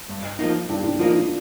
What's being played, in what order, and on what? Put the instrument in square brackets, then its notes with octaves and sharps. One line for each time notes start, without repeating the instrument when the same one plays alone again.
[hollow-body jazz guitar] G2
F3 A#3 D#4
[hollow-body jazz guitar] G2 [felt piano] D4
[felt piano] D4
[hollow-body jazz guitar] F3 A#3 D#4 [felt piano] F4
[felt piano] D4